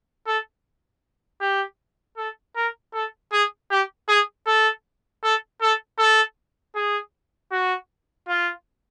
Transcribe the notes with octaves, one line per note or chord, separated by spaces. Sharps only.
A4
G4
A4
A#4
A4
G#4
G4
G#4
A4
A4
A4
A4
G#4
F#4
F4